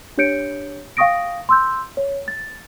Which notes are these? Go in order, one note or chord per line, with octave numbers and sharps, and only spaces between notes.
D4 G4 C#5 G6 C#7 D7
F5 G5 C#6 D#6 A#6 D7
C6 E6 G6
C#5
A6